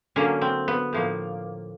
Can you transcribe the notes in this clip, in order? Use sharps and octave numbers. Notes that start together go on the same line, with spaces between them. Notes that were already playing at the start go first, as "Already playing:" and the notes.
D3 F#3 A#3 C#4
C4
B3
A2 F3 A#3